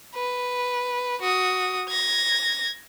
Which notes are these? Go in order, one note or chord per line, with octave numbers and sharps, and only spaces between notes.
B4
F#4 D#6
G#6 A#6